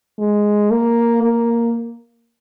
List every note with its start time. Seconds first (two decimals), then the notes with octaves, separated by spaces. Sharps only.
0.19 G#3
0.70 A#3
1.22 A#3